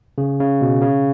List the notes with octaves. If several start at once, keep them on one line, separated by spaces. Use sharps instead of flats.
C#3
C#3
B2
C#3